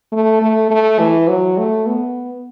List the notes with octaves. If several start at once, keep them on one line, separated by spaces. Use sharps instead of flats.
A3
A3
A3
E3
F#3
A3
B3